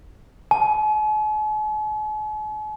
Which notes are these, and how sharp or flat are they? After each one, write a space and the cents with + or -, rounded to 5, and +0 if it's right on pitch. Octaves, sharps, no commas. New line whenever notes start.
G#5 +45